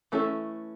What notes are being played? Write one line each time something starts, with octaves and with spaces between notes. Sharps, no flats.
E3 A3 C#4 E4 A4